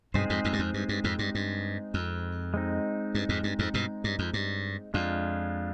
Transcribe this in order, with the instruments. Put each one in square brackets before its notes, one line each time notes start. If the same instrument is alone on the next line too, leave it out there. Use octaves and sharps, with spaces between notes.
[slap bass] G2 B2 [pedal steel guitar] G#3 C4 D#4 G#4 C5
[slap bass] F2 G#2
F2 G#2
G2
F2
G2
G2
F2 G#2
G2
G2
F2
[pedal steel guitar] G#3 C4 D#4
[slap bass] G2
F2 G#2
G2
F2 G#2
G2 B2
G2
F2
G2
[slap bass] F2 [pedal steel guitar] G#3 D4 F4